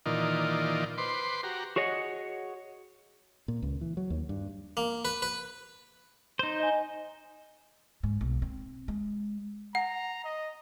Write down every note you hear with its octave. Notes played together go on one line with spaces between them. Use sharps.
A#2 D#3 E3 D#4 F4 D5
B4 C5 C6 D6
F#4 G4 A#5
F#4 G#4 C#5 D#5 F#5
A#2
C#2
E3
F#3
D#2
G2
A#3
B4
B4
D#4 C5
D#5 G#5
G#2
B1
C4
G#3
F#5 A#5
D#5